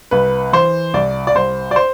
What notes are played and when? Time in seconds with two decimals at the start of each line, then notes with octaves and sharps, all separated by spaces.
0.11 C2 B4
0.53 E3 C5
0.94 C2 D5
1.27 D5
1.35 C2 C5
1.71 D5
1.76 C5